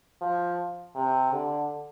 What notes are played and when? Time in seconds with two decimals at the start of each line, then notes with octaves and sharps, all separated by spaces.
0.21 F3
0.95 C3
1.32 D3